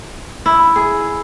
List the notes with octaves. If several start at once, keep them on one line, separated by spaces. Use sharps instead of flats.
E4
G#4